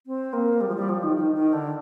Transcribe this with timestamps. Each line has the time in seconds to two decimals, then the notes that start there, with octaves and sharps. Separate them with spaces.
0.07 C4
0.33 A#3
0.61 G3
0.69 F3
0.75 G3
0.89 F3
1.03 D#3
1.17 D#3
1.35 D#3
1.53 D3